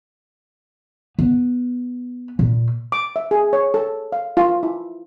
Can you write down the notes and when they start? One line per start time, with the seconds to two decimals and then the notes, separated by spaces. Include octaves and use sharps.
1.19 B3
2.39 A#2
2.92 D6
3.16 E5
3.31 G#4
3.53 C#5
3.74 A4
4.12 F5
4.37 F4
4.63 E4